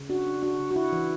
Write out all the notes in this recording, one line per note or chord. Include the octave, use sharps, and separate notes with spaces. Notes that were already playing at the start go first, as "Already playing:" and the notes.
Already playing: C#3
D4 F#4
D4
D4 F#4
C#3
F#4
C#3 E4
E3